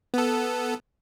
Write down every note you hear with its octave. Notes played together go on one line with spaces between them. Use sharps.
B3 A4